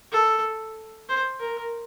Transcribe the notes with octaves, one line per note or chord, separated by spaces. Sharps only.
A4
C5
A#4